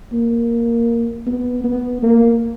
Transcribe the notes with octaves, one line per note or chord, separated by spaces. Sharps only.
A#3
B3
B3
A#3